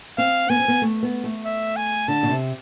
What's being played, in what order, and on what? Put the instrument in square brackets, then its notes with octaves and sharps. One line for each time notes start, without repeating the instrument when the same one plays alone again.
[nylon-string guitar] C4 [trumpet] F5
[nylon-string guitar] B3 [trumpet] G#5
[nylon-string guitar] C4
B3
A3
B3
A3
[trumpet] E5
G#5
[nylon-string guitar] D3 [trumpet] A5
[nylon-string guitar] B2
C3